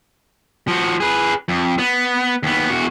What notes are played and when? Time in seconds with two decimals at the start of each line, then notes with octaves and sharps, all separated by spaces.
0.68 F3 F#4
1.00 G#4 B4
1.48 F2
1.78 B3
2.43 D#2 B3
2.70 E2 F#4